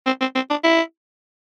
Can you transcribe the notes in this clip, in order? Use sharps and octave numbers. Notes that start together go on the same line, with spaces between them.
C4
C4
C4
D4
E4